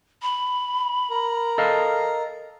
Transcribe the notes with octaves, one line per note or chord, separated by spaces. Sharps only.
B5
A#4
A4 D#5 F5